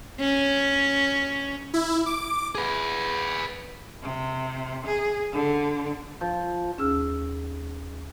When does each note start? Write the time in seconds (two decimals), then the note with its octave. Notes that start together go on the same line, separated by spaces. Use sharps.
0.21 C#4
1.74 E4
2.06 D6
2.55 G#4 B4
4.02 C3
4.86 G#4
5.32 D3
6.21 F3
6.78 D#2 C#4 G#4 E6 F6